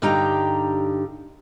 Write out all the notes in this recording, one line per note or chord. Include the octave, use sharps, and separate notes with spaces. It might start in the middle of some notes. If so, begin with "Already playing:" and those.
G2 D3 D#4 G4 G5 A#5